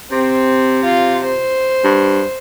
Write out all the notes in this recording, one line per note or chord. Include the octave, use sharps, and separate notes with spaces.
C3 C4
F4
C5
G2